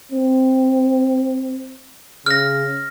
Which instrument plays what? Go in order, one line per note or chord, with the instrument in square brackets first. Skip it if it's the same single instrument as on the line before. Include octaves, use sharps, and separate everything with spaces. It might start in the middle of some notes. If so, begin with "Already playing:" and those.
[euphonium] C4
[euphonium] C#3 [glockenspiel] F6 A#6